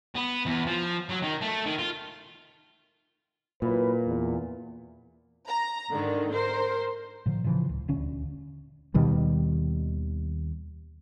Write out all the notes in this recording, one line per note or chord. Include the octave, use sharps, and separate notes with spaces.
B3
E2
F3
F#3
D#3
A3
D#3
F4
A#2 F#3 E4 B4
E2
A#5
G#2 D3 D#3
A#4 C5
A2 D3 F3
A2 C#3 E3 F3
C#2
D#1 D2 D3 C#4
D#2 B2 D#3 G3